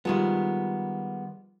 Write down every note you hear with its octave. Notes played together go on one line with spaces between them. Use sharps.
D#3 F3 G3 G#3 B3